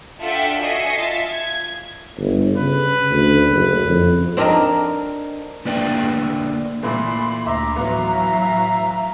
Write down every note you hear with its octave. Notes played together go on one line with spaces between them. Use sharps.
D4 F4 A4 E5 F#5 G5
F#4 D#5 E5 G#5 C7 C#7
F4 E5 A5
G#6
G1
C#3 B4
D2
F#1
F2
C4 D4 A4 A#4 D#5
D3 A#3 B4 D5 E5 G5
A#2 E3 A3 B5 C6
D2 E5 A#5 C6 D6
A2 E3 F#3 B3 E5 F5 A#5